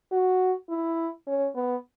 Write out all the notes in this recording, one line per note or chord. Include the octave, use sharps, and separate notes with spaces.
F#4
E4
C#4
B3